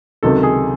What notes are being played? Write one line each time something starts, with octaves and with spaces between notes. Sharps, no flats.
C#2 C3 D#3 F#3 A4
G#4